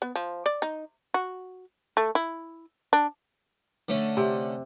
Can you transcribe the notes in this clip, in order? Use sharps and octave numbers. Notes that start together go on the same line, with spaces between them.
B3
F3
D5
D#4
F#4
A3
E4
D4
D3 A3 C#4
C3